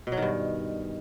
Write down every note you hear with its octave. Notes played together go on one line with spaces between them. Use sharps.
B2
F#3
D#3
G2